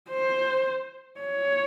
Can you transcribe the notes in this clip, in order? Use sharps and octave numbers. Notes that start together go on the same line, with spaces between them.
C5
C#5